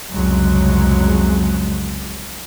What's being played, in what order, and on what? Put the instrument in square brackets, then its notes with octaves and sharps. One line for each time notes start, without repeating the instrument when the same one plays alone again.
[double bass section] C2 F2 C#3 F#3 G#3